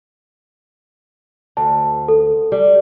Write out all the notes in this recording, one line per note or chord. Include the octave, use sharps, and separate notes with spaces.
D2 A5
A4
G3